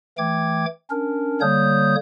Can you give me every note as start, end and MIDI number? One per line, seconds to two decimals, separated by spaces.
0.18 0.65 52
0.18 0.65 57
0.18 0.65 79
0.18 0.65 86
0.18 0.65 92
0.90 1.41 61
0.90 1.41 62
0.90 1.41 70
1.41 1.95 50
1.41 1.95 55
1.41 1.95 58
1.41 1.95 73
1.41 1.95 87
1.41 1.95 91